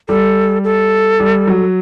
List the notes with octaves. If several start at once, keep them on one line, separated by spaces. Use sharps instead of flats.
G3 A4
A4
G3
F#3